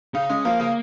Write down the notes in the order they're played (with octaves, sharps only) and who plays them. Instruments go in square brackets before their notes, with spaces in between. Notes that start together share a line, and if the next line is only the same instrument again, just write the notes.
[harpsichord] C#3 [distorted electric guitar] D#4
[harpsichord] G#3 [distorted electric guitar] C#4
[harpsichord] F3 [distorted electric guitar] A#3
[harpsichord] C#3